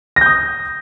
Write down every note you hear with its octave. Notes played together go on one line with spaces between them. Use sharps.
D#6 G6 A#6